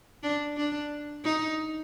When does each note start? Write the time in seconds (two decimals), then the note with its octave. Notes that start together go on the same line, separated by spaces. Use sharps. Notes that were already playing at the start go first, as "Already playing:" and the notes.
0.23 D4
0.57 D4
1.24 D#4